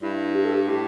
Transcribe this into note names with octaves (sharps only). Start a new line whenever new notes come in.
G2 E4
G4
A4
G4
A2 G4